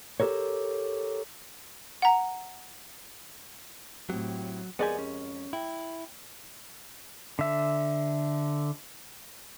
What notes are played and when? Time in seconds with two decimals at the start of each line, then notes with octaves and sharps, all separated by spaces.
0.20 G4 A4 A#4 C#5
2.02 F#5 A#5
4.10 A2 F#3 C4 G4
4.79 F2 G#3 B3 G4 A#4 D5 G#5
4.99 C#4
5.53 E4 G5
7.39 D3 E5